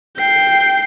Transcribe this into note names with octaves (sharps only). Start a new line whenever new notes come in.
G5 C7